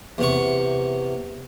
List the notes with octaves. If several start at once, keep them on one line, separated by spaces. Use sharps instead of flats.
E2 C3 C#6